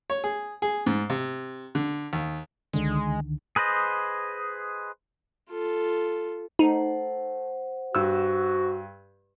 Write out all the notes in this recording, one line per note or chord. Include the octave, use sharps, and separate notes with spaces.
C#5
G#4
G#4
G#2
C3
D3
D#2
C#2 D3 D#3 G#3
G#4 B4 C5 D#5
F4 A4
A3 D#4 C5 F#5
G2 F#4 E6